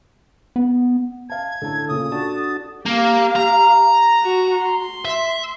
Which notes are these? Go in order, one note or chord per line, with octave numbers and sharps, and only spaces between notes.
B3
F5 A5 G#6
A2 D3 A3 A4 A5
A#2 C#3 D#6
D4 F#4 A4 A5
A#3 G4 F5
A#5
F#4
C6
E5